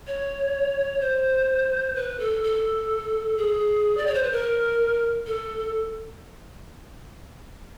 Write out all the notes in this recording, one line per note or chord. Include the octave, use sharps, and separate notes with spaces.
C#5
C5
B4
A4
A4
G#4
D5
C#5
C5
B4
A#4
A4